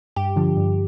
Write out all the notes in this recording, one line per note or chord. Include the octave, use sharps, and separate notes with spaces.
G2 G4
D3 F3
G2